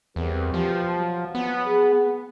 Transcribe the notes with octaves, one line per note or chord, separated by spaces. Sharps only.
E2 G3 C4 A#4
B2 F3 G4
F#3
B3
G#4